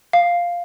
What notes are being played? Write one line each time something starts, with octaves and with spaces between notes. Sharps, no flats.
F5